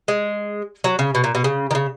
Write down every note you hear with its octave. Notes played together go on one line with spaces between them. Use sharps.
G#3
F#3
C#3
B2
A#2
B2
C#3
D#3
C#3